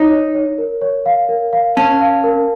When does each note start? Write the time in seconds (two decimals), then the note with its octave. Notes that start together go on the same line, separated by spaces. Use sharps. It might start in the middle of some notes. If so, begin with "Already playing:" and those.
Already playing: D#4 C#5
0.10 C#5
0.34 C#5
0.58 A#4
0.81 C#5
1.06 F5
1.29 A#4
1.53 F5
1.77 C#4 A5
2.01 F5
2.24 A#4